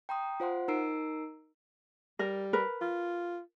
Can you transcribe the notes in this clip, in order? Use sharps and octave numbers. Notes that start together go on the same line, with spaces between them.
G5 A#5 C6 D#6
F4 C5 F#5 C6
D#4 A#4 A#5 E6 C7 D7
G3 A#4
A#4 B4
F4